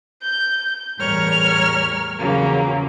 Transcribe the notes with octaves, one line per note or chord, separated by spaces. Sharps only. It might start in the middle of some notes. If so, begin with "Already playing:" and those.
G6
E2 A2 G3 A#4 C#5 F6
E2 C#3 F3 F#3 A#3